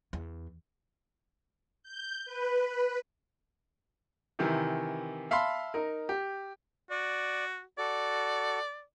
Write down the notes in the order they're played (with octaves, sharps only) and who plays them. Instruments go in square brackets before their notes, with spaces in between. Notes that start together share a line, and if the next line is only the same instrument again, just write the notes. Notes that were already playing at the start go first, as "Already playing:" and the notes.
[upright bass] E2
[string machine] G6
B4
[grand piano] C3 D#3 E3
E5 F5 A5 B5 C6
D#4 A#4
G4
[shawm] F#4 [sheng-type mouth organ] D5
[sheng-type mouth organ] F#4 A4 [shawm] D5